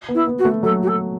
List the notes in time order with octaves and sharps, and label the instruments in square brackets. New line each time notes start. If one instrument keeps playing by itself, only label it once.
[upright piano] B3
[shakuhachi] E4
[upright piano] B3
[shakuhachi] F#4
[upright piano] A3
[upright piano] F#3 [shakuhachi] A4
[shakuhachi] F#4
A4